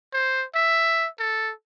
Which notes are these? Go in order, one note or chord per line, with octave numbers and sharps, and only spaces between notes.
C5
E5
A4